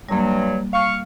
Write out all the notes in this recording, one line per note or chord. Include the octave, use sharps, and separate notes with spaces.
G2 F#3 G3 A#3
F5 C#6